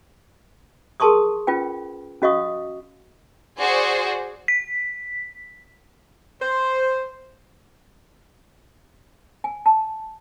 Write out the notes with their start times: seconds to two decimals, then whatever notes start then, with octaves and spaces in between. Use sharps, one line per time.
1.00 G#4 A#4 A5 C6 C#6 D#6
1.47 C#4 F4 B4 G5
2.22 C#4 F#4 D#5 F5 C#6 D#6
3.60 F#4 G#4 C5 D5 G#5
4.48 B6
6.41 C5
9.44 G#5
9.66 A5